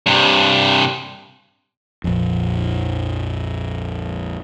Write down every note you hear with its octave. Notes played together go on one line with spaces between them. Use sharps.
G2 C3
A#1 F2